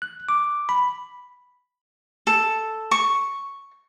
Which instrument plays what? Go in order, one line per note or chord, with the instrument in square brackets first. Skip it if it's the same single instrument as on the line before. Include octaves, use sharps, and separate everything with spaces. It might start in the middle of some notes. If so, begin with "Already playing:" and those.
[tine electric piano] F#6
D6
B5
[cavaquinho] A4
C#6